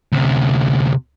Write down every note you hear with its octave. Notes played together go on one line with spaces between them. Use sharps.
D2 C3